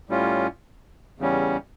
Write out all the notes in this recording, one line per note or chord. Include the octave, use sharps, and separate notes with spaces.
A2 G3 C#4 F4
E2 C#3 G3 C#4